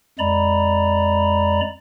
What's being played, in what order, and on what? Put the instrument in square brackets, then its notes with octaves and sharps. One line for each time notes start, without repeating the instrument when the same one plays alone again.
[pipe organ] F2 G#3 D5 A#5 B5